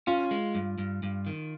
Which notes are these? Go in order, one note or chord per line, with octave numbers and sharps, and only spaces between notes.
C#4 F4
G#3
G2
G2
G2
D#3